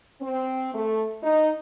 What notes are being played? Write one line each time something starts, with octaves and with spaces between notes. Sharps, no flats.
C4
A3
D#4